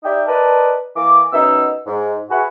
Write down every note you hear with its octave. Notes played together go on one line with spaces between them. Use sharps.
D#4 G4 D5 E5 G5
A#4 B4 D5 D#5 A5
E3 A#3 D6
F#2 B3 D#4 E6
G#2
F#4 G#4 B4 E5 F#5